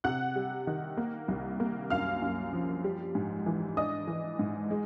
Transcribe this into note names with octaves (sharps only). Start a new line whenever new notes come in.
C3 F#5 F#6
G3
D#3
A#3
C2
A#3
F#2 F5 F6
F#2
F3
G3
G#2
E3
D4 D#5 D#6
E3
G#2
G#3